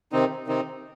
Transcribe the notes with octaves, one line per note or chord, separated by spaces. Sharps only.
C3 D#3 C4 D#4
C3 D#3 C4 D#4